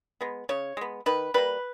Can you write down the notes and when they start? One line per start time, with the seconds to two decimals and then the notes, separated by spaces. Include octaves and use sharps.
0.21 G#3 B3
0.49 C#3 C#5
0.77 G#3 B3
1.06 D#3 B4
1.34 G3 A#3 B4